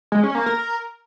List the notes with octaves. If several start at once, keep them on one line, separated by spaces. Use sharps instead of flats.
G#3
C#4
A#3
A#4